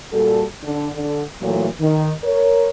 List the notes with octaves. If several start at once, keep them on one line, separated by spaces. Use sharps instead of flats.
A#2 G3 F#4 A4
D3 D4
D3
A#2 E3 F#3 A3
D#3
A#4 C#5